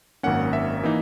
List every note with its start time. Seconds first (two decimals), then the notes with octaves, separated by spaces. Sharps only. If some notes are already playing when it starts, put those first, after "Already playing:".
0.23 G#1 F#2 D#3 A#3 C#4 F#5
0.53 E5
0.83 E3 A#3 D#4